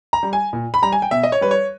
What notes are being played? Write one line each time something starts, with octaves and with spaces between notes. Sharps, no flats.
A#5
G3
G#5
A#2
B5
G3 A#5
G#5
G5
B2 E5
D#5
C#5
G3 B4
C#5